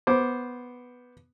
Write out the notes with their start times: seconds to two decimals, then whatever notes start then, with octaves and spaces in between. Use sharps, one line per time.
0.07 B3 C5 D6